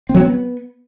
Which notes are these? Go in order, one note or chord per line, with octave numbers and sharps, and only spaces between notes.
C4
F#3
C4
B3